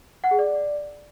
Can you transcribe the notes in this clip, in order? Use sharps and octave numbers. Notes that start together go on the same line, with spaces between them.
F#5
G#4
D5